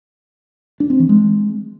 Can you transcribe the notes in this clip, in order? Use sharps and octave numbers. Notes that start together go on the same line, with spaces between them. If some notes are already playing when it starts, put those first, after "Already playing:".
D4
C4
E3
G#3